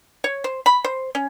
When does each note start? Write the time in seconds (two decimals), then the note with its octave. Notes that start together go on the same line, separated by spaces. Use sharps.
0.24 C#5
0.44 C5
0.66 B5
0.84 C5
1.15 C#4